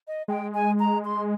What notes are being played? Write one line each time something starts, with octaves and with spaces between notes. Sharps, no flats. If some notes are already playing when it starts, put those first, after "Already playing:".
D#5
G#3 G5
G#5
A#5
C6